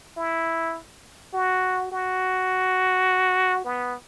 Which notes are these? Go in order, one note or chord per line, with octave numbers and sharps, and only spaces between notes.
E4
F#4
F#4
B3